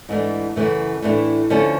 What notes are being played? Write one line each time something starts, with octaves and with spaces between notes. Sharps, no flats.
G#2 E3 A3 D4
F#2 C#3 E3 A3
A2 E3 A3 D4
D3 F3 A3 C#4